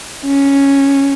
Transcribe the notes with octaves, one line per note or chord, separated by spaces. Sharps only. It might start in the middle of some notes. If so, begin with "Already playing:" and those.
C#4